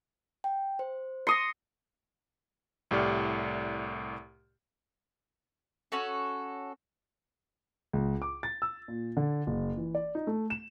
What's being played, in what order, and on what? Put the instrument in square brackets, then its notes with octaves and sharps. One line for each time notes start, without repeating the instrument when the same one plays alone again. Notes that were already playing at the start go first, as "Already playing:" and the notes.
[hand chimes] G5
C5
[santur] C6 D#6 [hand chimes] A#6 C#7
[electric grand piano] C2 A2 G4 D5 F6
[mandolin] C#4 F#4 A4
[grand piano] C#2
D6
A6
E6
A#2
D3
F#1
E3
D5
D#4
A3
E7